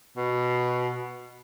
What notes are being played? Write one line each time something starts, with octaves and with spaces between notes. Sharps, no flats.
B2